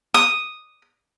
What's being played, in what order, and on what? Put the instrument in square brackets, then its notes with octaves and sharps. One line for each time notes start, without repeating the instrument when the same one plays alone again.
[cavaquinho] D#6